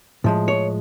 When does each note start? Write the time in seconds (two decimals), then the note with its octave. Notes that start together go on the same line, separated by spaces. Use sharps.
0.24 A2 F3 G#3
0.48 C#5